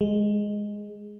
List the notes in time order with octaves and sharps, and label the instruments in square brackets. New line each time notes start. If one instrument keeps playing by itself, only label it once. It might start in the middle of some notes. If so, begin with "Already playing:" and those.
[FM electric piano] G#3